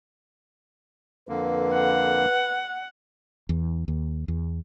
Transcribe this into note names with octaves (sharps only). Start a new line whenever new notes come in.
F2 D3 A#3 B4
F#5
E2
D#2
E2